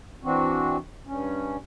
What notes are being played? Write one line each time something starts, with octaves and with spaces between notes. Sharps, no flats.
E3 C4 D4 F#4
G2 C#4